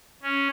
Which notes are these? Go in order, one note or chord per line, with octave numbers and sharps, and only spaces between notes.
C#4